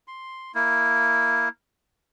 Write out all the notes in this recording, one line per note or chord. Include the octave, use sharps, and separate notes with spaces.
C6
A#3 E4